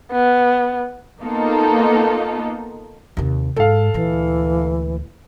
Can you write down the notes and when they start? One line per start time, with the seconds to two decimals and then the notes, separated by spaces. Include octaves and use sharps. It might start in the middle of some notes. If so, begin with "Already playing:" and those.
0.12 B3
1.21 A#3 B3 D#4 F4 A4
3.17 D#2 C3
3.56 G#2 A4 F5
3.94 D2 A#2 E3